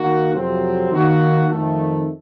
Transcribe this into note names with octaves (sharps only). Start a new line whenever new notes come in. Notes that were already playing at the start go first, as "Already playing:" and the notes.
Already playing: D#3 A#3 D#4 F#4
F2 C3 F#3 C4
D#3 A#3 D#4 F#4
F2 D#3 A3